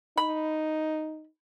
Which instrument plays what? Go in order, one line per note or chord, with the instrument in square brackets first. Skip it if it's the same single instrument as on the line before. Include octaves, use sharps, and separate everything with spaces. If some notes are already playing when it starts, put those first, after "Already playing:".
[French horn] D#4 [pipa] B5